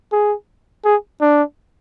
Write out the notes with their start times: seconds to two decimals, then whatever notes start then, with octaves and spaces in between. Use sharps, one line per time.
0.12 G#4
0.85 G#4
1.21 D4